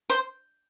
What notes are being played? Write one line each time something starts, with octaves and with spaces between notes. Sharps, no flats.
C5